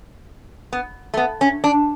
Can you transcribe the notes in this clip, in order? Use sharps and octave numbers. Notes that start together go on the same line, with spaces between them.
B3
A3
B3
C#4
D4